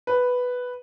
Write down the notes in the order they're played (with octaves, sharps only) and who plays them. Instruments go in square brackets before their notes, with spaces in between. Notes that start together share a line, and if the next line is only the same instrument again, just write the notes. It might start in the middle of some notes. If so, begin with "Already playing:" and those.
[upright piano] B4